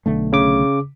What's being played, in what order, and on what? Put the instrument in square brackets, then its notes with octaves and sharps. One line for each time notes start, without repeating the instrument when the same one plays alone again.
[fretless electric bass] B1 D3 A3
[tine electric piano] C#3 D6